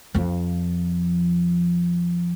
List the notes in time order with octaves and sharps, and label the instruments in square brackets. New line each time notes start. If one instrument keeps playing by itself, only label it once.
[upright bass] F2 F3